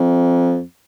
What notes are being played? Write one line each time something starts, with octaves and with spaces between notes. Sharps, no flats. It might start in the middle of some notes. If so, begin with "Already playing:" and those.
Already playing: F2